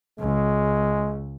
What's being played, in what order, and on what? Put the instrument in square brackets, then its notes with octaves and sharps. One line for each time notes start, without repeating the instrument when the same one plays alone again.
[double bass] C#2 [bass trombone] G#3